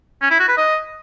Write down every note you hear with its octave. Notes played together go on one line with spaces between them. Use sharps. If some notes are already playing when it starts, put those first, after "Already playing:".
C#4
E4
F#4
B4
D#5